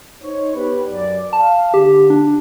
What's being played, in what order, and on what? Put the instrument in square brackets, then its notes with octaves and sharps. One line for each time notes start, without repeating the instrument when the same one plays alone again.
[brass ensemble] D#4 C5 C#5
B3 G4 B4
F#2 D5
[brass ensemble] F5 [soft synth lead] A5
[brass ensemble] D3 [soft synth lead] G4
[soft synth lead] D4